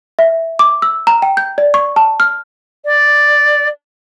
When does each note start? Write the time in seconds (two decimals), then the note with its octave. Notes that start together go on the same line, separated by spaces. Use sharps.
0.19 E5
0.59 D6
0.82 E6
1.07 A#5
1.22 G5
1.37 G6
1.58 D5
1.74 C#6
1.96 A5
2.20 F6
2.85 D5